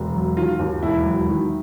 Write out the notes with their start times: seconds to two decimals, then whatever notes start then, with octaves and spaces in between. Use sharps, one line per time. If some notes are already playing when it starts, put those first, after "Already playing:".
Already playing: E1
0.14 F#3
0.37 D#3 F4
0.59 D#2
0.83 E1 E4
1.06 F#3
1.29 D#3